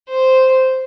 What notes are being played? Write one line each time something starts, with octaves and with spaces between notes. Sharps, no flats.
C5